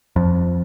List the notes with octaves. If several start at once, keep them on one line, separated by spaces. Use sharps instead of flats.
F2